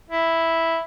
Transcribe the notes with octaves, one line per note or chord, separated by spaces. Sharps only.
E4